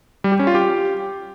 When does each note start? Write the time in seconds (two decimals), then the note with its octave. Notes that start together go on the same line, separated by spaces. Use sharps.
0.24 G3
0.32 G4
0.39 C#4
0.47 F4
0.55 G4